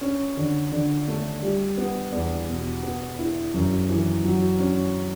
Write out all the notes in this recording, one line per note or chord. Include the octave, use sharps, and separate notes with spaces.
C#4
D3
D3
A3
G3
B3
E2
B2
B3
E4
F#2
E3
F#3
C#4